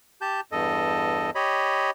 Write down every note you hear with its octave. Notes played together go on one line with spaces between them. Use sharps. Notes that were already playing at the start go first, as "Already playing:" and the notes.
G4 A5 G6
E2 G2 A4 D#5
G4 C#5 D#5 B5